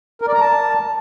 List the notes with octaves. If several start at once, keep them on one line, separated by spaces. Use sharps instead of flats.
A#4
D5
A#5
A5